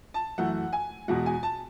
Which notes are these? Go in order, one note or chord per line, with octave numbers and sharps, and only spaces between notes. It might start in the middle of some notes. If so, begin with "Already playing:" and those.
A5
F#2 E3 A3 F#5
G#5
E2 B2 G#3 F#5
G#5
A5